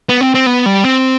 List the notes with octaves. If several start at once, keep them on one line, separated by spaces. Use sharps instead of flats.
B3
C4
C4
B3
G3
C4